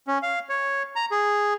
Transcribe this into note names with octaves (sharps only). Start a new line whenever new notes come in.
C#4
F5
C#5
A#5
G#4